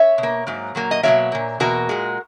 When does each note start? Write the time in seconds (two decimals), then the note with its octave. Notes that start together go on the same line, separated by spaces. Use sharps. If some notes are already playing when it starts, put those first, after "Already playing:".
Already playing: C#5 E5
0.18 B2
0.23 A#3
0.47 G#2 F#3 A#3
0.75 A#2 F#3 A#3
0.91 D#5
1.03 B2 F#3 A#3 C#5 E5
1.32 A#2 A#3
1.60 E2 B2 A#3 F#4 A#4
1.89 A#2 G#3